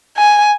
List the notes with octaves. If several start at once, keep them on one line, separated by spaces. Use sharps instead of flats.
G#5